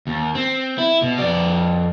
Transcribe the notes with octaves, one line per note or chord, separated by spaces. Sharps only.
D#2
C4
E4
B2
F2 D5